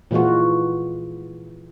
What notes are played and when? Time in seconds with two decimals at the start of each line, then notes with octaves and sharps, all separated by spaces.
0.11 A#2 E3 G#3 F4 F#4